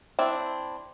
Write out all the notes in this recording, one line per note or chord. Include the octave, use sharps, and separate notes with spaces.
C4 D4 E4